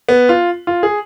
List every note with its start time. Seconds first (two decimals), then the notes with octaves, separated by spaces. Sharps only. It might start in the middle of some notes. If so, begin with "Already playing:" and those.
0.09 B3
0.29 F4
0.67 F4
0.83 G#4